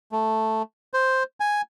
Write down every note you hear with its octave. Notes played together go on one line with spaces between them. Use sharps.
A3
C5
G#5